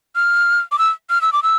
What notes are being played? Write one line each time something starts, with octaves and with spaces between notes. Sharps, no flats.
F6
D6
E6
F6
E6
D6
E6